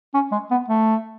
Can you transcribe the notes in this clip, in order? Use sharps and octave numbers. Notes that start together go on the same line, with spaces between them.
C#4
G#3
B3
A3